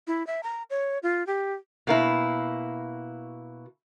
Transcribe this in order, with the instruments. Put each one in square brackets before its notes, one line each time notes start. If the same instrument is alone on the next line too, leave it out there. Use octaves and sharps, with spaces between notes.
[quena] E4
E5
A#5
C#5
F4
G4
[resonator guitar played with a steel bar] B2 A#3 E4